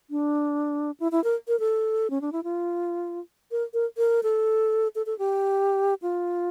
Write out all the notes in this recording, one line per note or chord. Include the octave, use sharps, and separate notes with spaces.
D4
E4
E4
A#4
A#4
A4
C#4
D4
E4
F4
A#4
A#4
A#4
A4
A4
A4
G4
F4